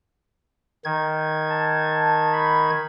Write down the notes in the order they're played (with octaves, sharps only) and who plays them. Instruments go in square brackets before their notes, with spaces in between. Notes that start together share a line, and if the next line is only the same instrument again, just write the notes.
[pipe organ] D#3 G#6
[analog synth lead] A5
B5